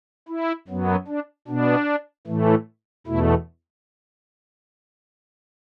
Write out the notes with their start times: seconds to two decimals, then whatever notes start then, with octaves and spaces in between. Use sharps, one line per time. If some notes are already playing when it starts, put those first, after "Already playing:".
0.29 E4
0.68 F#2 F#3 B3
1.08 D4
1.48 B2 B3 D4
2.27 A2 E3 A3
3.07 E2 B2 A3 E4